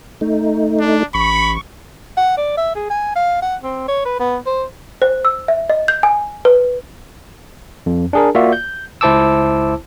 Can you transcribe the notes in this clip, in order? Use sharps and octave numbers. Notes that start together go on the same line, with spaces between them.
A3 D#4
D4
A1 B5 C#6
F#5
D5
E5
G#4
G#5
F5
F#5
C4
C#5
B4
B3
C5
C5
E6
E5
D#5
G6
G#5
B4
F2
D4 G#4 A#4
A#3 F4 F#4 D5 E5 F5
G6
C#2 E4 C5 A5 D6 E6